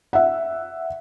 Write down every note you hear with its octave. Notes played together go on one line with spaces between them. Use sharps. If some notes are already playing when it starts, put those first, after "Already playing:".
E5 F#5